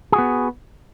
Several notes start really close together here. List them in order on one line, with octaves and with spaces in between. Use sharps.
G#4 F#4 B3